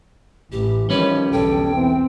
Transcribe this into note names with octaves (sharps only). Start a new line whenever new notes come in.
A1 E3 G4
D#3 F3 G3 C#4 B4 C#5
B1 E2 D3 A4 G5
E3 C4